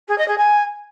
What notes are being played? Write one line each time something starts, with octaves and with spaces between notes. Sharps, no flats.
G#4
D#5
G#4
G#5